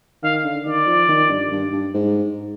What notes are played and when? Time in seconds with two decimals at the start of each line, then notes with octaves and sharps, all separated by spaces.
0.23 D#3 F5
0.44 D3
0.66 D#3 D5
0.87 F3
1.09 D#3
1.30 G2
1.51 G2
1.73 G2
1.94 G#2